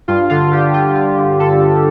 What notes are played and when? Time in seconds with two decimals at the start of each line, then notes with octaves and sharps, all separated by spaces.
0.08 G2 F4
0.30 D3 F4
0.52 D3 G4
0.74 D3 F4
0.95 D3 F4
1.18 D3
1.40 D3 A4
1.61 G2